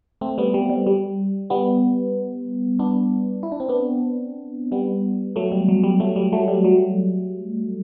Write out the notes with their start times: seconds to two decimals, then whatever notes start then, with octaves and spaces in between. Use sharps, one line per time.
0.21 A3 C4
0.38 G3 B3
0.54 G3
0.70 G3
0.87 G3
1.50 G3 B3
2.79 B3 D4
3.43 E4
3.52 D4
3.60 C4
3.69 B3 D4
4.72 G3 B3
5.36 F#3 A3
5.52 G3
5.69 F#3
5.84 G3
6.00 F#3 A3
6.16 G3
6.33 F#3 A3
6.48 G3
6.64 F#3